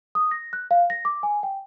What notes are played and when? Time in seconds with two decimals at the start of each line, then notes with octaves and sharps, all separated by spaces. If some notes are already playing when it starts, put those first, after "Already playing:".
0.15 D#6
0.31 A#6
0.53 F#6
0.71 F5
0.90 A#6
1.05 D6
1.23 G#5
1.43 G5